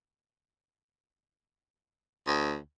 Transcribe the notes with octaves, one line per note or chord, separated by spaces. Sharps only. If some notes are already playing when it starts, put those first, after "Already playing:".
D2